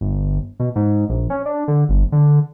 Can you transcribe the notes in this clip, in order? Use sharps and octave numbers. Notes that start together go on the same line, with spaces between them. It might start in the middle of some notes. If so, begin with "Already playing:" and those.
G1
B2
G#2
A#1
C#4
D4
D3
G1
D3